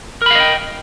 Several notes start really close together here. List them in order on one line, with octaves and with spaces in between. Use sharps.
A#4 B5 F5 D#5 G5